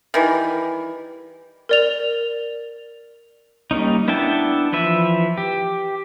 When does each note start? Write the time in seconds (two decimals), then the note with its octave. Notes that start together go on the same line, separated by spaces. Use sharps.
0.14 D#3 E3 G3
1.69 A#4 D5 F7
3.71 G3 A#3 C#4 D#4
4.08 B3 D4 E4 G5 A5
4.73 E3 F3 B4 E5
5.38 G4